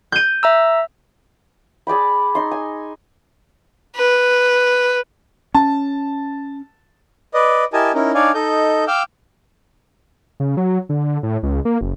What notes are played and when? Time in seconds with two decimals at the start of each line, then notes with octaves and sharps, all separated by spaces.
0.12 G6 D#7
0.43 E5 A#5 E6
1.87 G#4 D5 G5 B5
2.35 D#4 C6
2.51 G#5
3.97 B4
5.55 C#4 A5
7.34 B4 D5 D#5
7.73 E4 G4 A#4 D#5 G#5 A5
7.94 C#4 D#4 E4 A#4
8.14 D4 D#4 C#5 D5 F5 G#5
8.34 D#4 A4 D#5 G6
8.88 F5 G5 D6 E6 F6 G6
10.40 C#3
10.57 F#3
10.89 D3
11.23 A2
11.43 C#2
11.65 A#3
11.81 F#1